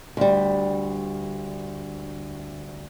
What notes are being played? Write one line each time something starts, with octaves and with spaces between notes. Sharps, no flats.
D2 G3